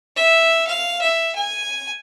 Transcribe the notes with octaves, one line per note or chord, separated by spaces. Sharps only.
E5
F5
E5
G#5